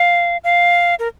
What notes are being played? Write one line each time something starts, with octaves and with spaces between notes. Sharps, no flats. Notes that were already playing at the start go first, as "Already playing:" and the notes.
Already playing: F5
F5
A#4